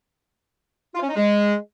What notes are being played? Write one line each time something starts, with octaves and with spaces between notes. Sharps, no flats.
F4
C#4
D#4
G#3